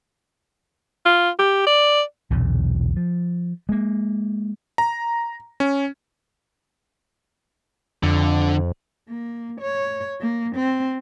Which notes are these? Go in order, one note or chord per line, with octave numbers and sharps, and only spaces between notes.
F4
G4
D5
B1 E2 A#2 D3
F3
G#3 A#3
A#5
C#4
F2 D3
A#3
C#5
A#3
C4